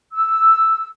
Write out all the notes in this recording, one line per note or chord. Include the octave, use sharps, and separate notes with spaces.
E6